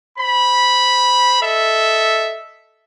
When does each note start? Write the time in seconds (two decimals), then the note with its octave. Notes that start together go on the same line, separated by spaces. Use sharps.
0.18 C5 B5
1.41 A4 D#5 E5